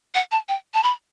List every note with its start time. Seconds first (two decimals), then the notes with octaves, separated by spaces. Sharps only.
0.15 F#5
0.32 A5
0.49 G5
0.74 A5
0.83 B5